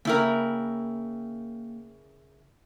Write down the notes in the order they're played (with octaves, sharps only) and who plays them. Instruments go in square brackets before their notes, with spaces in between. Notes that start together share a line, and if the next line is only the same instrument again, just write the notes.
[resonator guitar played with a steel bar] C#3 E4 A#4 [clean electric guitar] A#3 G5